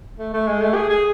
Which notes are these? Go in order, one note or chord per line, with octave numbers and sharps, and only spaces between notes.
A3
A3
G#3
A3
G#4
G#4